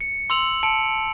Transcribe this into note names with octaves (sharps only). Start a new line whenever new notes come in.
C#7
C6 E6 F7 F#7
A5 C#7 D7